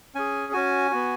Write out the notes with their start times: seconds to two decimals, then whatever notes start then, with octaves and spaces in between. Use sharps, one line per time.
0.15 C#4 G#4 G#5
0.53 C#4 F#4 G#5
0.91 B3 F#4